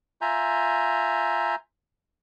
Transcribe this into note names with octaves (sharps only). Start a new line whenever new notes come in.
F4 E5 G#5 A#5 G6